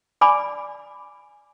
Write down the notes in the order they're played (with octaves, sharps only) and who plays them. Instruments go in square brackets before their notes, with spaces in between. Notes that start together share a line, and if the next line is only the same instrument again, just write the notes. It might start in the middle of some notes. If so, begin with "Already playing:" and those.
[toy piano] D5 G#5 B5 D6